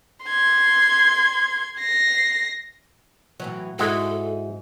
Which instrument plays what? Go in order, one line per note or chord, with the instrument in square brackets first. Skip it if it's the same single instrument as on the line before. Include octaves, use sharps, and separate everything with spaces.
[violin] C6 G#6
A#6 C7
[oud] A2 E3 F#3
[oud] G#2 [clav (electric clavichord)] G#3 E4 F#4 [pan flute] A4